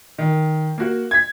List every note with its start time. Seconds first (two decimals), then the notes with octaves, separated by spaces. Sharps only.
0.18 D#3
0.78 A#3 F#4
1.11 G#6 B6